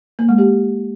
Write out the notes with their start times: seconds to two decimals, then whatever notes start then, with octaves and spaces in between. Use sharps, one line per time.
0.19 A#3
0.29 G#3
0.38 G4